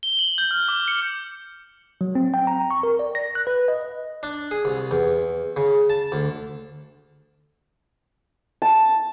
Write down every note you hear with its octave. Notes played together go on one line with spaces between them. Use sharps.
G7
F#7
G6
F6
D6
C#7
F#3
C4
G5
A#5
C#6
A#4
D5
A#6
F#6
B4
D#5
D4
G#4
C2
E2
C#3
A5
D2
A5